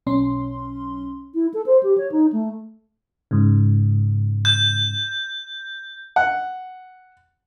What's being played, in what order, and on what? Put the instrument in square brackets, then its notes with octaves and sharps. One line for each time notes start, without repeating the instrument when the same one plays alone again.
[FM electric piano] B1 C#4 C6
[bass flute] E4
A4
C5
G4
C#5
D#4
A3
[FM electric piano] G#2 C#3
[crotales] G6
[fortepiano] F#5